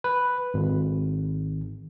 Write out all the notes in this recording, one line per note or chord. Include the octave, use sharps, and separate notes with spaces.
B4
G#1